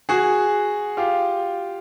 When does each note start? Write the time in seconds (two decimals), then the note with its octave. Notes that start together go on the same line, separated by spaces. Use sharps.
0.09 F#4 G#4
0.97 F4 G4